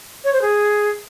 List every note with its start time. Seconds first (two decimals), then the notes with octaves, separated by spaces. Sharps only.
0.24 C#5
0.33 C5
0.42 G#4